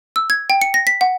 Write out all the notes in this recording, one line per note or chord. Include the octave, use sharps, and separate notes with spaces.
E6
G#6
G5
C#7
A#6
B6
F#5